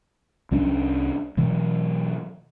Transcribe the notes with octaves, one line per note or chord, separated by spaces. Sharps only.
C2 G3 C#4 D4
B2 E3 F#3